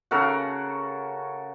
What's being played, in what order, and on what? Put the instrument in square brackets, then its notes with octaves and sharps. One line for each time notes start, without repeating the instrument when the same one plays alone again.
[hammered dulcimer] C#3 F#4 A4 A#4